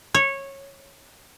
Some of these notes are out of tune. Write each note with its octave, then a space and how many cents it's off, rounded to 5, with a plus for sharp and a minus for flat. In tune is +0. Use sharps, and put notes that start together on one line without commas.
C#5 -15